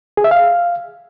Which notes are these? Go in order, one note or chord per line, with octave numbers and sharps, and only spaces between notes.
G#4
E5
F5